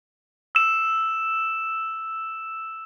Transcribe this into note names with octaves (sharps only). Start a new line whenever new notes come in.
E6 E7